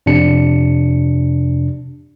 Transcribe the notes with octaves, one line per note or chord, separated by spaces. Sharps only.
F2 C3 D4 C#7